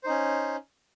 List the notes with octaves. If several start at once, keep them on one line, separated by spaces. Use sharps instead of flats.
C#4 D#4 C5